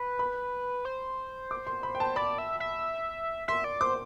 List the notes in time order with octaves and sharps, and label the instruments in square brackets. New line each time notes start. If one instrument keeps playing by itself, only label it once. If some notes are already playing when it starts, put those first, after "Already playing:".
Already playing: [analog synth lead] B4
[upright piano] B5
[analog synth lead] C5
[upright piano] D6
C6
B5
G5
A5
[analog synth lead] D5 [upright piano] B5
[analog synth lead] E5
E5
[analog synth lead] E5 [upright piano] C6
[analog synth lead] D5
[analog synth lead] C5 [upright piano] D6